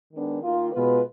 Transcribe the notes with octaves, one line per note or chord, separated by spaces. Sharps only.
D#3 G#3 B3 D4
D#3 A#3 F4
B2 G#3 B3 F4 B4